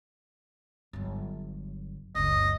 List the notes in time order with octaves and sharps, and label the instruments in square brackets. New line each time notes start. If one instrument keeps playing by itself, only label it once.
[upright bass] G1 F#3
[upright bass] F#1 C#2 [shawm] D#5